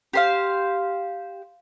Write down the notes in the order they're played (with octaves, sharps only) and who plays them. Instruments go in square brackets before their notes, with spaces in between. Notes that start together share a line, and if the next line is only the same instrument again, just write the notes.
[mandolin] G4 C5 F5